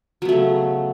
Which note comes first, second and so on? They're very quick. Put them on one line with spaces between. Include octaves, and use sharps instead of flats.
F#3 B3 A3 C#3